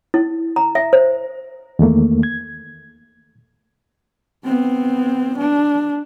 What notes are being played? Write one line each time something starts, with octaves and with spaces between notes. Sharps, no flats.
E4
A#5
E5
C5
E2 D#3 A3 A#3
G#6
B3 C4
D4